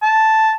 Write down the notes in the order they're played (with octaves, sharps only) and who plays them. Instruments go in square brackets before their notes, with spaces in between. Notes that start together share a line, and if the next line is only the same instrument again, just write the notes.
[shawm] A5